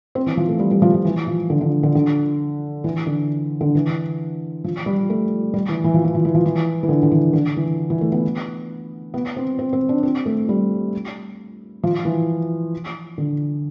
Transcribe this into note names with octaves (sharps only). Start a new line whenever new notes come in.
C4
E3
F3
A3
G3
G3
F3
F3
E3
F3
D3
D3
D3
D3
E3
D3
D3
E3
F3
G3
A3
G3
E3
E3
F3
E3
F3
E3
F3
E3
E3
D3
D3
E3
D3
E3
E3
A3
B3
B3
C4
C4
C4
D4
C4
A3
G3
F3
E3
D3